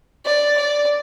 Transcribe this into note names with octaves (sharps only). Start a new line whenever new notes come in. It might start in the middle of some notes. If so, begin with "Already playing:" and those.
D5
D5